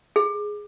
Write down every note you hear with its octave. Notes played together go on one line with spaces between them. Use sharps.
G#4